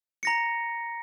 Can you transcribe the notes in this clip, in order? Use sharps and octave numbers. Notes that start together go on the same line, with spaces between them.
A#5 A#6 C#7